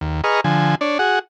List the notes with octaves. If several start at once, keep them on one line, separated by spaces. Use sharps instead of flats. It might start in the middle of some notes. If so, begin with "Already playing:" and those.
D#2
G#4 B4 D#5 A#5 C#6 F6
D3 F3 G#5
D4 C#5 D5
F#4 G#4 F#5